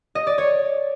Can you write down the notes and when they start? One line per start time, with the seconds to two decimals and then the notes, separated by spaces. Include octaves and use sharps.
0.15 D#5
0.27 D5
0.38 C#5